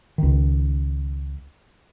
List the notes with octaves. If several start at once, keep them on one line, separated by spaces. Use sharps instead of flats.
C#2 D#3